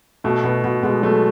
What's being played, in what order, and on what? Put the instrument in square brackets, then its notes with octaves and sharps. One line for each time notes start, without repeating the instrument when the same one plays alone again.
[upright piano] B2 [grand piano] A3
[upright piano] B2 [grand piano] B3
[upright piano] B2
[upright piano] B2 [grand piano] G#3
[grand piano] F#3 [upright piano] A3